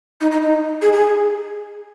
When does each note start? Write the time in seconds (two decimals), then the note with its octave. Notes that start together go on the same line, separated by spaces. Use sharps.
0.20 D#4
0.31 D#4
0.41 D#4
0.81 G#4
0.93 G#4